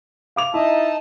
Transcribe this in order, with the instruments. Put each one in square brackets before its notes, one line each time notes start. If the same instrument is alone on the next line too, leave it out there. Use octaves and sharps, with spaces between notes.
[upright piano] F5 D6 F7
[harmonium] D#4 D#5 A5 [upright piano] E4